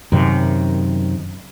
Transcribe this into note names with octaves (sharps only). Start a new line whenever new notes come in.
F#2 C3 D#3